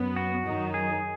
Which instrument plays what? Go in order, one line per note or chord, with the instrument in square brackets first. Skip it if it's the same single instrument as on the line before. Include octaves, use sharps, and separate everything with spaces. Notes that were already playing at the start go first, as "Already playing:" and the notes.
Already playing: [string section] F#2 F#3 B3
[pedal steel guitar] F#4
[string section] F#2 D#3 F#3 D#4
[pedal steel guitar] G#4